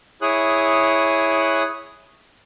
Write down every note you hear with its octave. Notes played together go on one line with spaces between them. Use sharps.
E4 G#4 C#5 D#6 F#6